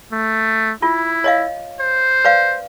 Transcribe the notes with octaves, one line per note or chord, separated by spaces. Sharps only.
A3
E4 F4
C#5 D#5 F5
C5
B4 D5 F5